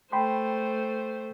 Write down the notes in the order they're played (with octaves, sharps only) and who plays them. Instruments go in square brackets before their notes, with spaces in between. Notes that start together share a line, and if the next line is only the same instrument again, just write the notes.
[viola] A3 C5 [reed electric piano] G5 B5 C6